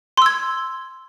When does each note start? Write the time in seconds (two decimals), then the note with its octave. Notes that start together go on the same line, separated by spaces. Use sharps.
0.17 C6
0.22 E6
0.26 G#6